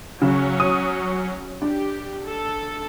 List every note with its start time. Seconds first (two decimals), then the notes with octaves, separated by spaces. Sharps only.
0.22 C#3 F#3 C#4
0.60 D#6
1.62 D4 G4
2.25 A4